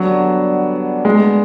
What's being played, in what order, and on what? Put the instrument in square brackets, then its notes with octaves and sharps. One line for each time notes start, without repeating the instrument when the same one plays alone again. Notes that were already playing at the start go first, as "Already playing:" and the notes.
Already playing: [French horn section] D3 G3 B3 D4 [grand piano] F#3
[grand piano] G#3